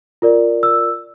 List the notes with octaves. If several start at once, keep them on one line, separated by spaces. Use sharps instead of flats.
F4 A#4 D5
E6